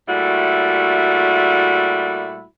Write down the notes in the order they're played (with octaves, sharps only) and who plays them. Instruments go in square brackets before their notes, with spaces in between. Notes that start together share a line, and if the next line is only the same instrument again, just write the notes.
[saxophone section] A#2 G3 A3 E4 F#4